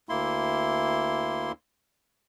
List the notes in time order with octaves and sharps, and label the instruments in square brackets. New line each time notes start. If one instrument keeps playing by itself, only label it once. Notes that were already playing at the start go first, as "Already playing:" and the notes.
[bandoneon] D2 A#3 E4 C6